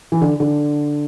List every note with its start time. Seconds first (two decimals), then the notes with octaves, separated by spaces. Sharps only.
0.12 E3
0.21 D3
0.40 D3